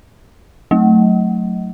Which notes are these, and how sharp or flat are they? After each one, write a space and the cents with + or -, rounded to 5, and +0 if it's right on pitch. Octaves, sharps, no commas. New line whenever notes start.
F#3 +0 A3 +0